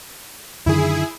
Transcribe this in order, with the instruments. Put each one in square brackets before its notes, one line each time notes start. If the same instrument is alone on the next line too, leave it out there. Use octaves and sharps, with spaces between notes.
[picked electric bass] F#2 D3 D#3 [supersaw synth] E4 G#4